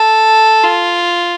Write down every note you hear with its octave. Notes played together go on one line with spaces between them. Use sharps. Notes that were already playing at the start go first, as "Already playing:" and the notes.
Already playing: A4
F4